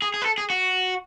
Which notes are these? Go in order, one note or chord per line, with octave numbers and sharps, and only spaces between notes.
G#4
G#4
B4
A4
G#4
F#4